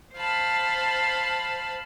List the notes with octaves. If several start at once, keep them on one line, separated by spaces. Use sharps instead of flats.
C5 F5 A5 B5